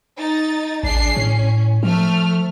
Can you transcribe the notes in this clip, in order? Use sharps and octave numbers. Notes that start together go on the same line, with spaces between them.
D#4 A6
A1 D4 G#4 C7
A2 C#4
F3 A3 F6